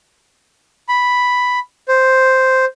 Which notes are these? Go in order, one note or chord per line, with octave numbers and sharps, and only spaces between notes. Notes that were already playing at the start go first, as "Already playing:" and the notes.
B5
C5